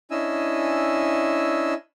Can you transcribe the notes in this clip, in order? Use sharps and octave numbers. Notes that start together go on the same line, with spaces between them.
C#4 D4 E4 D#5 G#5 E6